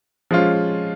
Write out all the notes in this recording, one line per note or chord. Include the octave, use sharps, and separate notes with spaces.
F3 G#3 C#4 F4